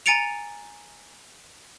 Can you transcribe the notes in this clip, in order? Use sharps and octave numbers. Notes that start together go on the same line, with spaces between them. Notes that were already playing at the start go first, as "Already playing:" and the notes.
G#5 A#5 A6 C#7 D7 F7